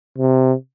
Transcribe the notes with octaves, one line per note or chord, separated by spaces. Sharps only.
C3